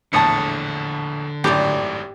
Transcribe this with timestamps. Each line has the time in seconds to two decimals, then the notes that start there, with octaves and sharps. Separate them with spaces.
0.13 A#1 E2 A2 D3 A5 D#6 C#7
1.44 G#1 F#2 A2 G4 D5